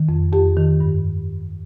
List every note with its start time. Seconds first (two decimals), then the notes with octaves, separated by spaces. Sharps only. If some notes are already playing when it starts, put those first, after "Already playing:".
Already playing: D#3
0.09 F2
0.33 F2 G4
0.57 D#3
0.80 G2